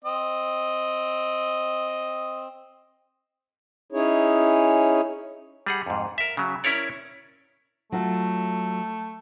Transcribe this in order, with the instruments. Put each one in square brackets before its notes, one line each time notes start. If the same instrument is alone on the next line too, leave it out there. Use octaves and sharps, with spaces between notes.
[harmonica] C4 D#5
[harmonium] C#4 D#4 E4 G#4 C#5
[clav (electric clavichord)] G3 G#4 F#5
F2 G#2
A#4 E5
C#3 F#3
C#4 E4 A#4 C#5 D5
[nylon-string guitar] F#3 F4 [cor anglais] A3